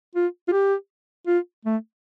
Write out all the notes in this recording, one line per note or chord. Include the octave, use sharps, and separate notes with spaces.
F4
F4
G4
F4
A3